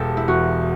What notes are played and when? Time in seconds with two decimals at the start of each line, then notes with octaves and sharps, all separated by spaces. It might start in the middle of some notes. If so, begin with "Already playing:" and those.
Already playing: E1 G4 A4
0.17 E4
0.28 E2 F#4